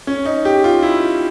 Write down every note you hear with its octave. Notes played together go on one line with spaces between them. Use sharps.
C#4
D#4
G4
F4
E4